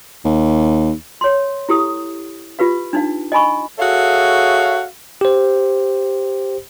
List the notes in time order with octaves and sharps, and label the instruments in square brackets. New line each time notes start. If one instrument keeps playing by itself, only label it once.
[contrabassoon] D#2
[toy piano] C#5 C6
E4 G4 A4 D#6
F4 G4 B4 F5
D4 D#4 F5
D#5 G#5 B5 C#6
[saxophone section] F#4 G#4 A4 C#5 E5 F5
[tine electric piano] G4 C5